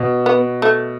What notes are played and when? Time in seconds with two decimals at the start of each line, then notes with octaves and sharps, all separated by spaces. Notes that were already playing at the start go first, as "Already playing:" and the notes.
Already playing: B2
0.26 B3
0.62 A3